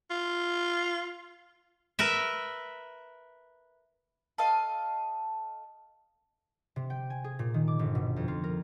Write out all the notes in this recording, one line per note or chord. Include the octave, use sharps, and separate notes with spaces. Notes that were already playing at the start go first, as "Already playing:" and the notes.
F4
A#4 B4 E5
A4 D#5 F5
C3
G5
G#5
G#4
A#2
D#3
D6
G1
B2
F2
F4
A#4